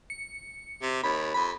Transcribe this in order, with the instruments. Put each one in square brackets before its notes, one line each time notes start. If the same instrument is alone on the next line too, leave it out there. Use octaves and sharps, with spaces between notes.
[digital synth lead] C#7
[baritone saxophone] C3
[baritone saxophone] D#2 [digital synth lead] B5
[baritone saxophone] F2 [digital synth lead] B5